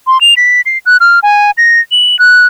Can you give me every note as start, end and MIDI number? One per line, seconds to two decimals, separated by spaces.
0.07 0.20 84
0.21 0.34 101
0.37 0.61 95
0.66 0.78 96
0.86 0.97 90
1.01 1.19 89
1.23 1.51 80
1.58 1.80 94
1.92 2.19 102
2.19 2.46 90